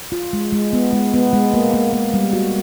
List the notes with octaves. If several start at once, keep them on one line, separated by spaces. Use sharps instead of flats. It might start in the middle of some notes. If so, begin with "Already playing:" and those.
F4
G#3
G#3
B3
G#3
B3
G#3
A#3
A#3
A#3
G3
F#4